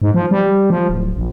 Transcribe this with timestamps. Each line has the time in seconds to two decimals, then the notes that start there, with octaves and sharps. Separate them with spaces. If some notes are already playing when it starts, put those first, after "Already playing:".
0.02 G#2
0.14 F3
0.31 G3
0.70 F3
0.89 D1
1.16 A#1